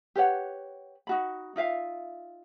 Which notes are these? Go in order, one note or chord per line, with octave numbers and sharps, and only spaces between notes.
G4 B4 C#5 F#5
D#4 F#4 B5
D#4 F4 E5 F5